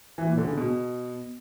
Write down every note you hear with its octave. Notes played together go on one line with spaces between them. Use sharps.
E3
A#2
D3
C#3
B2